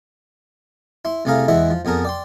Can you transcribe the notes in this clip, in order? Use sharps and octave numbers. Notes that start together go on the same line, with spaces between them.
E4 C6
C2 C3 A3 G#4 F5 A#5
E2 E3 G#3 E4 E5 F#5
F3
F2 B3 G#4 A#4 A5
D5 G5 C6